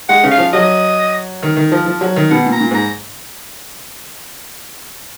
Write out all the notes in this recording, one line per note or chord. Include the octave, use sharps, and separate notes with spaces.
G#3 F#5
C#3
F5
F3
F#3 D#5
D#3
D#3
F3
F3
F#3
D#3
B2 F#5
A#2
A#5
A#2
G#2 A#5